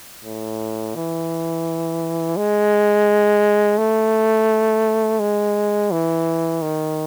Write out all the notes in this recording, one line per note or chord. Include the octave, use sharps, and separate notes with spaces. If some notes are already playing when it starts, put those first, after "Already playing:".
A2
E3
G#3
A3
G#3
E3
D#3